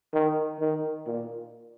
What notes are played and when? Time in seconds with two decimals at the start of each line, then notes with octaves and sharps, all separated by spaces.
0.14 D#3
0.60 D#3
1.07 A#2